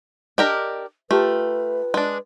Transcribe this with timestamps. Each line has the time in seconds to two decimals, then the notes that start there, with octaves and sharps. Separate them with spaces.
0.38 D4 G4 A#4 D#5
1.11 A3 F4 G4 A#4 B4
1.94 G#3 D4